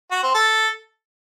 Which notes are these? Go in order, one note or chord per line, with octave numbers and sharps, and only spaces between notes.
F#4
C4
A4